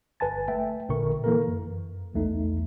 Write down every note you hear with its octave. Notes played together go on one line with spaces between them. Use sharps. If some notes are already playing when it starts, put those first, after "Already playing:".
G1 B4 G#5 A5 A6
A3 E5 G5
A1 A#2 D3 A#4 C#6
E3 A#3 A4 A#4
F#2
B1 E2 A3 D#4